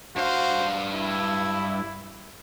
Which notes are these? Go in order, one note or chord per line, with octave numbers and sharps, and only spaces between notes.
G2 F#4 C5 F5
E4